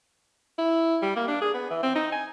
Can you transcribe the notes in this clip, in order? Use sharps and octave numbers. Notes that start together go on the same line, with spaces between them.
E4
G3
A#3
D4
G#4
B3
E3
C4
D#4
G#5